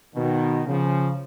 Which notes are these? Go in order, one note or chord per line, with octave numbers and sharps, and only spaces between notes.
B2 D#3
C#3 F3